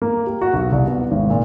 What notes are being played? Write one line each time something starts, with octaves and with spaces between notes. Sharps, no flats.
A#3
G4
F#4
B1
C2
B3
G#1
A#2